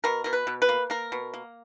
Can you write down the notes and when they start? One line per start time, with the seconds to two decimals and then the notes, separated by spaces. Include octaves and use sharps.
0.04 B2 A#4
0.24 B2 A#4
0.33 B4
0.47 B2
0.62 B4
0.69 A#3
0.90 A#3 A#4
1.12 B2
1.34 A#3